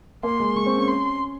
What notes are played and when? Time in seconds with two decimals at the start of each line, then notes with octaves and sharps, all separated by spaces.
0.23 A#3 C6
0.40 G#3
0.56 G#3 C#6
0.66 C4
0.78 C#4
0.88 C6